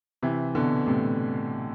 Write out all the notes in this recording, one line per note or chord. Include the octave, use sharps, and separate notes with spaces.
C3 E3
B2 D3
A2 C3